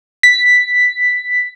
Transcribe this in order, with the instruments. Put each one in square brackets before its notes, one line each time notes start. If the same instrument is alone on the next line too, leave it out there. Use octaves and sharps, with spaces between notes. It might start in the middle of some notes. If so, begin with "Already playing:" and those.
[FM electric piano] B6